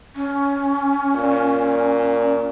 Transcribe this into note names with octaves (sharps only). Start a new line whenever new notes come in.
C#4
A#2